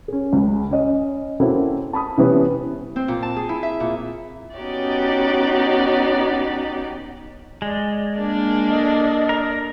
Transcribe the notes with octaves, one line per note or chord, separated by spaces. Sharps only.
C#4 G#4
C#2
C#4 D#5
A#3 C4 C#4 E4 F#4 A4
A5 B5 D#6
C3 E3 G3 B3 C#4
C4
A#2
A5
G#4
E4
E5
A#2
B3 C#4 D#4 F#4 G4 D5
G#3 D5
A#3 D4
A4 D5 D#5
A#4